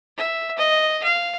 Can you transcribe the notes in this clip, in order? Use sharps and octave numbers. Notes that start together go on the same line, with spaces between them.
E5
D#5
F5